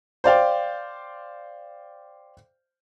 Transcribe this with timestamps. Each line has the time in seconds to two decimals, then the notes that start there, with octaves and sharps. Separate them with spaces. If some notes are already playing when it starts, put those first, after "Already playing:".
0.24 C5 D5 F5 G5